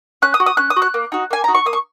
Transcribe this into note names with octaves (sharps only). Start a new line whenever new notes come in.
C#4 F#6
D#6
F#4
D#6
C#4 F#6
D#6
F#4
F#6
A#3
D#4 F#4
A#3 G#5
D#4 F#4 A#5
C#6
A#3 D#6
C#6